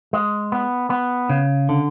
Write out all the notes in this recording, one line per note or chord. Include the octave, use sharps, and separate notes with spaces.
G#3
B3
B3
C#3
D3